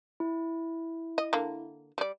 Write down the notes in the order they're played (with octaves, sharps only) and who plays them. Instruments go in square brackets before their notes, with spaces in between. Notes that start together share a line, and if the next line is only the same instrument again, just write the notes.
[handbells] E4
[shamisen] D#5
D3 A#3
G3 D5